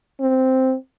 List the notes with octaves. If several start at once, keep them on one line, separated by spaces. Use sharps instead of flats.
C4